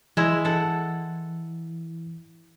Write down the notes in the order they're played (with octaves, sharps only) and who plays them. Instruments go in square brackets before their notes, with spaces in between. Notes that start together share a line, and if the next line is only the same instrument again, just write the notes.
[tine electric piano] E3 [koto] G#3 E4
[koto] A4 F#5